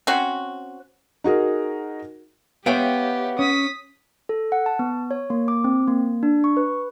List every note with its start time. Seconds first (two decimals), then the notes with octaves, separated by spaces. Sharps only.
0.07 C4 C#4 F#4
1.24 D#4 F#4 G#4 A#4
2.66 B3 G4 C#5 E5 F5 G5
3.39 C#4 D#6 B6
4.29 A4
4.52 F#5
4.66 A5
4.79 B3
5.11 C#5
5.30 A#3
5.48 D6
5.64 C4
5.88 A#3
6.23 D4
6.44 C#6
6.57 B4